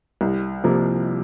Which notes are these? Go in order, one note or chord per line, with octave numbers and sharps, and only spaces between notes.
C2
C3 F3 A#3